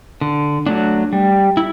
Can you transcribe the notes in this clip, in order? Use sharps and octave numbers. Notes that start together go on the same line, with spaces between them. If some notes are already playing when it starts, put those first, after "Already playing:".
D3
F#3 A3 D4
G3
E4